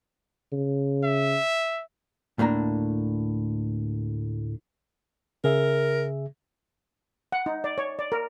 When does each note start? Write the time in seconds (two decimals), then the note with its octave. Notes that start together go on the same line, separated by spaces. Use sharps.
0.52 C#3
1.04 E5
2.38 D2 A2 A#3 D4 A#5
5.44 C#3 G#4 A#4 E5
7.32 F#5
7.46 D#4
7.64 D5
7.78 C#5
7.99 D5
8.12 A#4